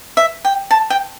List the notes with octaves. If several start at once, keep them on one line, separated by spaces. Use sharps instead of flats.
E5
G5
A5
G5